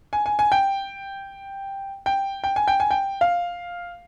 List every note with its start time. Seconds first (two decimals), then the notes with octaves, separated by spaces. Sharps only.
0.13 G#5
0.26 G#5
0.39 G#5
0.52 G5
2.06 G5
2.44 G5
2.56 G#5
2.68 G5
2.80 G#5
2.91 G5
3.21 F5